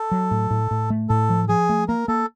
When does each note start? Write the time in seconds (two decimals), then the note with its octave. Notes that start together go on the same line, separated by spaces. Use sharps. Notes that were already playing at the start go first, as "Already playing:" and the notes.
Already playing: A4
0.11 F#3
0.31 A2
0.51 A2
0.71 A2
0.90 A3
1.09 A2 A4
1.30 F3
1.49 F3 G#4
1.69 A3
1.88 A#3 A#4
2.08 A#3 A4